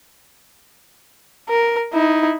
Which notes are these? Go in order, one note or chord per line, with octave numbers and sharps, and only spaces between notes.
A#4
D#4 E4